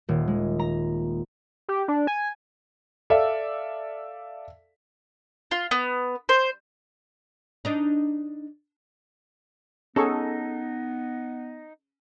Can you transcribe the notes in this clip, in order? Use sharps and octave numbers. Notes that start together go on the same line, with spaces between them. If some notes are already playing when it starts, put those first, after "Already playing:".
D#1
G#3
A#5
G4
D4
G#5
A4 D5 E5 F5
F4
B3
C5
D4 D#4
B3 C#4 D#4 G#4 A4 C#6